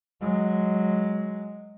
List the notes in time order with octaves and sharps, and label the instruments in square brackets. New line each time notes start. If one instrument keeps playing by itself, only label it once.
[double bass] F#3 G#3